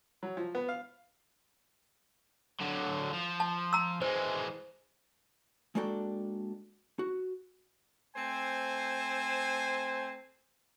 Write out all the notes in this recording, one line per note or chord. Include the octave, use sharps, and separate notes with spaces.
F#3
F3
B3
F5
D3 F#3
F3
A5
A#5 E6
E3 G#3 C5
G#3 A#3 D4 F#4 A4 G5
F#4
A3 C4 C5 G#5